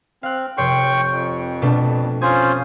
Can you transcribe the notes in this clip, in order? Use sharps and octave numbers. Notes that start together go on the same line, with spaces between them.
C4 F5 F#6
F1 C#5 G5 C6 C#6
F2
B2 A3 D4
C#4 F4 C5 D#6 G#6